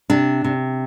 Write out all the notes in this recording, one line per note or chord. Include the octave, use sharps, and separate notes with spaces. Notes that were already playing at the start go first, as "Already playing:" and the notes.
C3 D4
C3